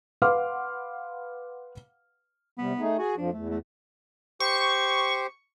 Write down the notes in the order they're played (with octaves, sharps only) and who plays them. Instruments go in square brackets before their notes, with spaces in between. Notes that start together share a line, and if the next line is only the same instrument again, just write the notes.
[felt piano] B4 F5 F#5 C6 D6 F6
[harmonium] C3 G3 [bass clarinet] B3
[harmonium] A3 D#4 G#4
[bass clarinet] F#4 [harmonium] G#4 G#5
[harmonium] F2 F3 [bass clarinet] D4
[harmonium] E2 [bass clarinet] A3
[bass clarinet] A3
[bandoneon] G4 C5 [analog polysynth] C#6